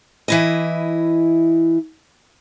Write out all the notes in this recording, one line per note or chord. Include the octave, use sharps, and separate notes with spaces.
E3 E4 D#5